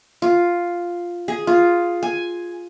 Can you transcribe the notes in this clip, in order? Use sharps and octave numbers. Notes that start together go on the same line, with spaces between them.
F4
G#4
F4
G#5